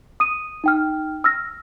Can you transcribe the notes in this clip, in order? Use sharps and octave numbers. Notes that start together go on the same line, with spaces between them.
D#6 D#7
D#4 G5 F6
E6 F6 A#6